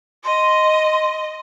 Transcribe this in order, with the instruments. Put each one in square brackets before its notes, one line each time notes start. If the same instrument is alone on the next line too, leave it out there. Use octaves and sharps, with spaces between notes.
[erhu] D#5 [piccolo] C6